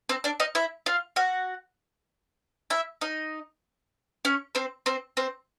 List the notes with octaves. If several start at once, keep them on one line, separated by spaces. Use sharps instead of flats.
C4 C5
D4 D5
D#4 D#5
E4 E5
F4 F5
F#4 F#5
E4 E5
D#4 D#5
C#4 C#5
C4 C5
C4 C5
C4 C5